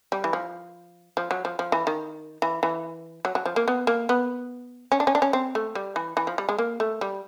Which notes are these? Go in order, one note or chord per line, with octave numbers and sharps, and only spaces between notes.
G3
E3
F3
F3
F#3
F3
F3
E3
D#3
E3
E3
F#3
F#3
F3
A#3
B3
A#3
B3
C#4
D4
C#4
D4
C#4
C4
A3
G3
E3
E3
F3
G3
G#3
A#3
A3
G3